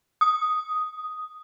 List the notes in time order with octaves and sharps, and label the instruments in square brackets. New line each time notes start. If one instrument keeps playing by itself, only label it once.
[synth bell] D#6